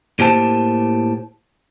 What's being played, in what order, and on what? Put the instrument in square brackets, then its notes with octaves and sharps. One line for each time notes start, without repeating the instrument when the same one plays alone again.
[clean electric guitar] A2 A#3 G4 C5 A5